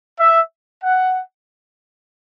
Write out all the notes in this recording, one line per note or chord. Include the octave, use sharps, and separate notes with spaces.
E5
F#5